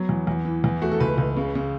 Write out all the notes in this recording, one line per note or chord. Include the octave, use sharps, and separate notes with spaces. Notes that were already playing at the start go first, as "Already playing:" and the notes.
Already playing: F#3 B3
E2
E2
E3
E2
A3 F#4
A4
C#2 B4
C#2
C#3
C#3